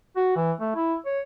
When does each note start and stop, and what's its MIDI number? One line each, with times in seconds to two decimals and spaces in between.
0.16 0.35 66
0.36 0.52 52
0.60 0.71 57
0.75 0.95 64
1.05 1.20 73